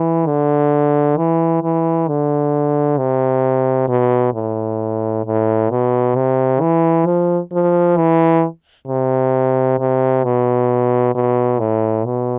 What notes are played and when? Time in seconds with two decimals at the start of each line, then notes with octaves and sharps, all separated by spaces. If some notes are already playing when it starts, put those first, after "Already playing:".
Already playing: E3
0.27 D3
1.17 E3
1.62 E3
2.08 D3
2.98 C3
3.89 B2
4.34 A2
5.25 A2
5.70 B2
6.16 C3
6.61 E3
7.06 F3
7.52 F3
7.97 E3
8.88 C3
9.79 C3
10.24 B2
11.15 B2
11.60 A2
12.06 B2